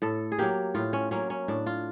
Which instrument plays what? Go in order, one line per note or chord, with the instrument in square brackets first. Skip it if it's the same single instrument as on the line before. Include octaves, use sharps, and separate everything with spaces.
[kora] A2 A4
G#4
F#3 A#3 G4
A2 F4
C#4
F#3 A#3 C#4
C#4
A2 D4
F4